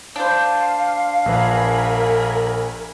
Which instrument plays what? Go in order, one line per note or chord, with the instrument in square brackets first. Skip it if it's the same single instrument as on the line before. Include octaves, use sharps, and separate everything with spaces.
[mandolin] D4 C5 [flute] F5
[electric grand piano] A#1 B4 [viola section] A#4 G#5 B5